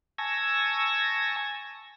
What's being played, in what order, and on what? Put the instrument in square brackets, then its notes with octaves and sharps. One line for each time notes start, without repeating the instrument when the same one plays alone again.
[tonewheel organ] G#5 A5 C#6 E6 G#6 A#6